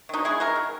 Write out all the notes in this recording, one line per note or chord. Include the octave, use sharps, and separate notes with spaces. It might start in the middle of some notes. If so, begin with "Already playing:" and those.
D#3 D#4 F#4
G#3 E4 G#4
G#3 F#4 A#4
D#3